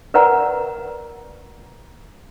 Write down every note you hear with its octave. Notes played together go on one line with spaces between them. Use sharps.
A#4 B4 D5 F#5 A#5